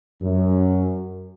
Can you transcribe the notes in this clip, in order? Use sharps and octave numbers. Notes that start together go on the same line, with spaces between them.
F#2